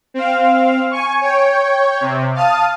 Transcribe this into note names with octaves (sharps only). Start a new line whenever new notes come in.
C4 F5
G#5 C#6
C#5 G5
C3
F5 A5 D#6